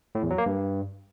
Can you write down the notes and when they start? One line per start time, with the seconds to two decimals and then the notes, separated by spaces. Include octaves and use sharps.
0.15 A2
0.23 E2
0.30 F#3
0.38 A#3
0.46 G2